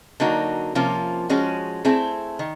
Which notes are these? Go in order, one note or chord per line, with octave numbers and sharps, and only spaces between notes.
D3 F#3 A#3 D#4 F#4
C3 F3 A#3 C#4 F4
F3 G#3 C#4 F#4
A3 C4 E4 G#4
D#3